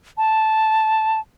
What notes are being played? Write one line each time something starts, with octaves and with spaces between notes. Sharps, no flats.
A5